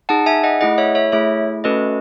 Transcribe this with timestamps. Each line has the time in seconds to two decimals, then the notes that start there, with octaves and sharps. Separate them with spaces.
0.09 D#4 G#4 F#5 A5
0.26 E5 G#5
0.44 D#5 F#5
0.61 A3 E4 G#4 D#5 F#5
0.78 C#5 E5
0.95 C#5 E5
1.12 A3 E4 G#4 C#5 E5
1.64 A3 C#4 F#4 A4 B4 D#5